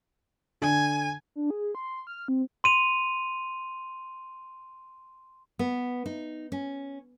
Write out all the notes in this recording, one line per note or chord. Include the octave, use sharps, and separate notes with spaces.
D3 G#5
D4
G#4
C6
F6
C4
C6 D#7 F7
B3
D#4
C#4